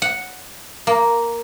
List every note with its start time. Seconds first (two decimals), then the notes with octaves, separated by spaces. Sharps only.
0.02 F#5
0.87 A#3